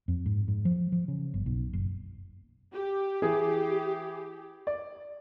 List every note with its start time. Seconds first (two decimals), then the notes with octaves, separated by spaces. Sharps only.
0.08 F2
0.26 G#2
0.48 G#2
0.65 F3
0.92 F3
1.08 C#3
1.34 G1
1.46 B1
1.73 F#1
2.74 G4
3.22 E3 G#4
4.67 D5